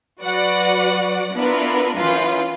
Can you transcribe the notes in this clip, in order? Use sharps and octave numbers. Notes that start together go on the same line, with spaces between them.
F#3 F#4 B4 D5 F#5
B3 D4 E4 F4 A#4 B4
F#2 E3 F4 B4